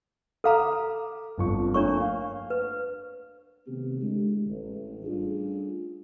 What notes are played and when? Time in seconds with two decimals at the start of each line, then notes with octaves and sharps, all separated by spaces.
0.44 A4 F5 A#5 D6 F6
1.37 G1 F2 C#6
1.74 A3 A#3 D4 C#5 C#6
2.00 F5
2.50 B4
3.67 C3 D#3 A3 B3 C4 G4
4.01 A2 D3 G#3
4.48 A1
5.04 G3 A3 C#4 D4 F4 G#4